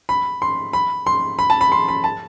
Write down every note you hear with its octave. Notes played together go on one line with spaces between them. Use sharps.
B5
C6
B5
C6
B5
A5
B5
C6
B5
A5